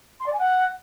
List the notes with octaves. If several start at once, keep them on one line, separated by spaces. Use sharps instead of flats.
C6
D5
G#5
F#5